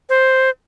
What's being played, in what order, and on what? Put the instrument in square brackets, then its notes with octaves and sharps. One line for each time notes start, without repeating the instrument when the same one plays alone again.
[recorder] C5